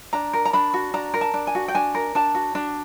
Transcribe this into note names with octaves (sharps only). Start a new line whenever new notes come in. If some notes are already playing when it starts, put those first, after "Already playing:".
D4 A#5
A#4
A#5
D4 B5
F#4
D4 A#5
A#4
A5
D4
G#5
F#4
G5
D4 G#5
A#4
D4 A5
F#4
D4